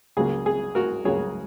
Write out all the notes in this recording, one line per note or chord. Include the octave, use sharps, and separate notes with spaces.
C#2 C#3 F#3 A#3 G#4
G#4
F#4 A#4
C#2 C#3 F#3 A#3 G#4 C#5